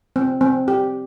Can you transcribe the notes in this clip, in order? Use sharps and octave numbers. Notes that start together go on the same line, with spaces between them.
C4
C4
G4